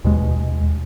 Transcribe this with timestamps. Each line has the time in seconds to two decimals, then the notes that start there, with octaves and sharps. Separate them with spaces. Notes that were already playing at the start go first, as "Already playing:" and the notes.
0.05 D#2 B2 G#3